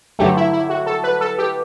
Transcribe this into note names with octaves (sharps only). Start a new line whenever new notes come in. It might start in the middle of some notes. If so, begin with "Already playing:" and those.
G2 D3 F#3 A3 G4
E4
E4
F#4
A4
B4
A4
G4